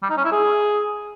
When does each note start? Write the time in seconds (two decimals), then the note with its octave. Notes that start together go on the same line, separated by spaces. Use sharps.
0.03 G3
0.10 D#4
0.17 C#4
0.25 E4
0.32 G#4